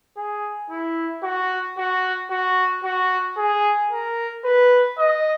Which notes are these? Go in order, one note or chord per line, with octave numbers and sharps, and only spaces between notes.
G#4
E4
F#4
F#4
F#4
F#4
G#4
A#4
B4
D#5